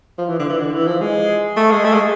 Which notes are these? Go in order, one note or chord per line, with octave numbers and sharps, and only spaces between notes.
F3
E3
D3
E3
D3
E3
F3
G#3
A3
G#3
A3
G#3